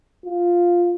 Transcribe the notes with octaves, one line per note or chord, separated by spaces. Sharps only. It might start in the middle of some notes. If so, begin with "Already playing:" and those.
F4